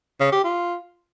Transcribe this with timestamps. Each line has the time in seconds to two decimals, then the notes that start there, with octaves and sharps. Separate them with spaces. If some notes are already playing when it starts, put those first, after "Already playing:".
0.20 C#3
0.32 G4
0.44 F4